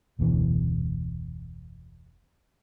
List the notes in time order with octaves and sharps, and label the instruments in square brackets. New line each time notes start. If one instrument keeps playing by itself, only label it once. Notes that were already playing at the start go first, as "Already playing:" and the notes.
[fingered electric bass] F1 D2 B2 E3